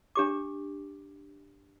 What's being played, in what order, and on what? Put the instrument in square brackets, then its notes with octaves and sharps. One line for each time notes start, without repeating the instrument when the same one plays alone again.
[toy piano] D4 G4 D6